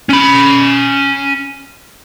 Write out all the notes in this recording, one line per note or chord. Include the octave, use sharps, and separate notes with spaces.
C#4 B5